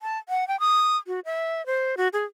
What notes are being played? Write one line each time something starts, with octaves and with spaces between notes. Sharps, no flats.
A5
F#5
G5
D#6
F#4
E5
C5
F#4
G#4